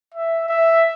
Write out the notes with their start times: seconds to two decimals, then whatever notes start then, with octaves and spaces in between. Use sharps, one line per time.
0.14 E5
0.49 E5